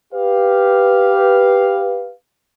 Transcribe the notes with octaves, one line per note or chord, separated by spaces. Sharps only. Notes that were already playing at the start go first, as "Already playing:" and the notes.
G4 B4 F5